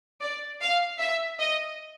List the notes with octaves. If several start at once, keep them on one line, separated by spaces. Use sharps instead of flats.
D5
F5
E5
D#5